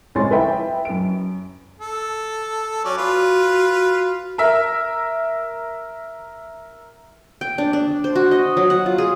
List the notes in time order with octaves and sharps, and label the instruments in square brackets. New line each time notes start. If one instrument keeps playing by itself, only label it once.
[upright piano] C#2 C4 C#5 G#5 C6 A6
B4 D#5 E5 G5 B5
F#2 D7
[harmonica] A4
F#3 C#4 D5
[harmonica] F4 B4 [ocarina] F#4
[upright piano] A#4 E5
[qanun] G5
D4
D4
C5
F#4
D#5
F#3
F#5
F4
G#4